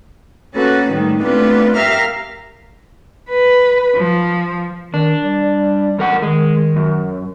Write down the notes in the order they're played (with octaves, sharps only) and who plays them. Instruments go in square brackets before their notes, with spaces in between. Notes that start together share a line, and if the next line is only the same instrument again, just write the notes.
[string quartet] A#3 C#4 F#4 A4 B4
A2 D#3 G3 G#3
A3 B3 C4 D4 F4 B4
G4 A#4 E5 F5 A#5 F6
[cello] B4
F3
[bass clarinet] D#3 [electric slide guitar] D4
[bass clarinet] G3
[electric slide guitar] E2 A#4 F#5
[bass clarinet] D#3 [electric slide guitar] G#3
[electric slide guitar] F#2